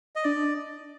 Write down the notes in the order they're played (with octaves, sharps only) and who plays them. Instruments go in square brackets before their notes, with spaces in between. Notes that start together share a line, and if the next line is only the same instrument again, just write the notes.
[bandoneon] D#5
[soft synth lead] D4 [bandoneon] D5